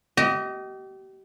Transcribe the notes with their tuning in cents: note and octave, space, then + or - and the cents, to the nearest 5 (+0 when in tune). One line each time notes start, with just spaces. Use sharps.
G4 -35 D#5 +0